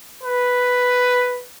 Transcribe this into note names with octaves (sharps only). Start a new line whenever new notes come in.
B4